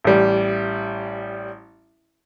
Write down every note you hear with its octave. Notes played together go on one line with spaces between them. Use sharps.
A1 G3